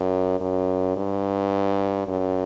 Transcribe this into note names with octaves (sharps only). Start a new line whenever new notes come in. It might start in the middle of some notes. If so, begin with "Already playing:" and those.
Already playing: F#2
F#2
G2
F#2